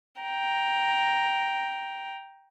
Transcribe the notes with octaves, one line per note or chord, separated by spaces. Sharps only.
G5 A#5